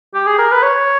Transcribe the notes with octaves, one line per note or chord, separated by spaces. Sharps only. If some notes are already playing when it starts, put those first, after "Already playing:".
G4
G#4
A#4
B4
C#5